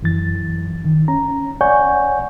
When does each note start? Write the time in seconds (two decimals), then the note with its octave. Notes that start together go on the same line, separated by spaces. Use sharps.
0.02 F#2 E3 A6
0.85 D#3
1.08 C#4 A#5
1.61 C#5 D5 F#5 G#5 C#6 G6